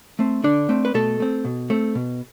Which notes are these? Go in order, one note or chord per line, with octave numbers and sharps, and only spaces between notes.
A3 C4
D3 D4
A3 C4
B4
B2 A3 A4
A3 C4
B2
A3 C4
B2